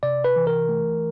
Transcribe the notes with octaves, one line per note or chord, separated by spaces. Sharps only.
C3 D5
B4
E3
A#4
A3